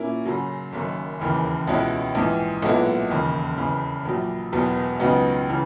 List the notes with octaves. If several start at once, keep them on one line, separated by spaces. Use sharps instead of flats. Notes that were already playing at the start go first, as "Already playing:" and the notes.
Already playing: A#2 A#3 C#4 E4
F#2 C#3 F#3
F#1 F#2 D#3
E1 D#2 C#3 E3 A#3
C#2 B2 G#3 C#4 E4
A#1 G#2 E3
B1 A#2 G#3 B3 E4
E1 D#2 C#3
E1 E2 C#3
A#1 A#2 F#3
E1 E2 B2 F#3 B3
C#2 C#3 F#3 B3 D#4
C#3 E3